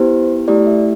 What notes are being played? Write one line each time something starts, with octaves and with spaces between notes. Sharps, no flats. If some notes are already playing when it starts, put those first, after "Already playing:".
Already playing: B3 E4 G4 C5
A3 E4 G4 D5
E5